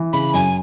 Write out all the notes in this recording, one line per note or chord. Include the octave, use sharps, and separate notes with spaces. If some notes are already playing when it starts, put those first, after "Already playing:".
Already playing: E3
C#3 B5
F#2 G#5